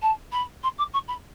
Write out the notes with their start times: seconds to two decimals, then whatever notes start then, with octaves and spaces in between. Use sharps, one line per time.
0.02 A5
0.32 B5
0.64 C6
0.78 D6
0.94 C#6
1.08 B5